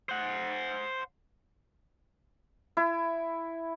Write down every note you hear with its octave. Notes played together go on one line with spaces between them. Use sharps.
C5 F#5
E4